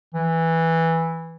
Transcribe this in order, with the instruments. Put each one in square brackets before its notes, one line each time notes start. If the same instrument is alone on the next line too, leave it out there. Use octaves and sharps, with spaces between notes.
[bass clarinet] E3